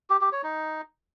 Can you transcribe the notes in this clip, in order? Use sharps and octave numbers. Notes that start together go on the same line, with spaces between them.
G4
G4
C#5
D#4